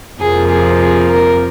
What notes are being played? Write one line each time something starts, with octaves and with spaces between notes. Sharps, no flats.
F2 C3 F3 A#3 G#4
G#4
G#4
A#4